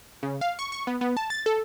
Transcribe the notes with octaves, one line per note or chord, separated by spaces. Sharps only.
C#3
F5
C#6
C#6
B3
B3
A5
A6
A4